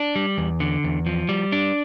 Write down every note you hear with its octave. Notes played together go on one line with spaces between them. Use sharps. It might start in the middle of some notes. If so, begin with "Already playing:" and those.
Already playing: D4
G3
E2
D3
E2
F3
G3
D4